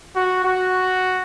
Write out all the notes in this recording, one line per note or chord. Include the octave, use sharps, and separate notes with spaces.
F#4
F#4